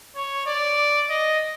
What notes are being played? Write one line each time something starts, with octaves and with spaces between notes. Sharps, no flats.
C#5
D5
D#5